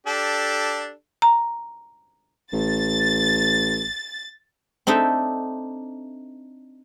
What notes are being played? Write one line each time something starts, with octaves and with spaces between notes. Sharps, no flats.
D4 G4 A4
A#5
A1 A6
C4 D4 D#4 A4 E5